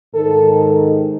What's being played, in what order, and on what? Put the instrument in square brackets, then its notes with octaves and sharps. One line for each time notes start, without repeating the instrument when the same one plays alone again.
[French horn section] G#2 D#3 A4